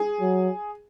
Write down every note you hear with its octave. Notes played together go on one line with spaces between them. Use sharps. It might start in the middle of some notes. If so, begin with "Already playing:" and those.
Already playing: G#4
F#3